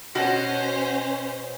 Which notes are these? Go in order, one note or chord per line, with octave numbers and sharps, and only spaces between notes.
B2 C#4 F#4 C5